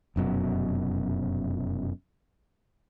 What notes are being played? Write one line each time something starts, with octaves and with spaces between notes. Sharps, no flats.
F1 F#2 B2